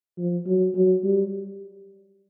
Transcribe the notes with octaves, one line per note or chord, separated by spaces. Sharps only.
F3
F#3
F#3
G3